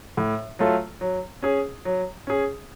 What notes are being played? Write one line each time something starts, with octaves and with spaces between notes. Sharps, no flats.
A2
F#3 A3 F4 A4
F#3
C#4 G#4
F#3
C#4 G#4